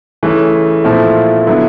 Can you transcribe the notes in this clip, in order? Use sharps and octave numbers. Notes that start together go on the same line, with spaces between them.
C#3 E3 A3
A#2 F3 A3 C4 E4
D3 F#3 B3 E4